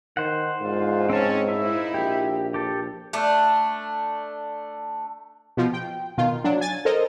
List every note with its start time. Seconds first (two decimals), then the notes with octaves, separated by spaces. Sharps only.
0.17 D#3 C5 F#5
0.61 E2 G#2 D3 F4
1.10 C4 C#4 A5
1.48 A#2 D#4 E4 E5
1.94 A#1 G4
2.54 G4 A4
3.13 A3 D4
5.57 B2 F3
5.73 G5
6.18 B2 D#3 F4
6.44 F#3 D4
6.61 G#5 A6
6.85 A4 A#4 C5 D#5